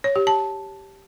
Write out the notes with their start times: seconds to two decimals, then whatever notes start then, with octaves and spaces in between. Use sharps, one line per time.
0.04 C#5
0.16 G4
0.27 A5